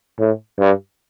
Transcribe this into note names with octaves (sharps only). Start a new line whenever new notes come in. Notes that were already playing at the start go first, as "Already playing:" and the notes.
A2
G2